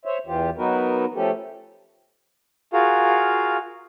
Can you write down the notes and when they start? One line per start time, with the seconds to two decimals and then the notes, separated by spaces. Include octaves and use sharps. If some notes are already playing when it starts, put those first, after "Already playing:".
0.05 C5 C#5 E5
0.27 E2 E3 F4 G4
0.57 F#3 B3 D#4 F#4 A#4 B4
1.15 F3 A3 C#4 G4 A4
2.73 F4 F#4 G#4 A#4 F5